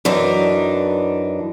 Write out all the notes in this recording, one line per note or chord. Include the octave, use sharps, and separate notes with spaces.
F#2 E3 D4 D#4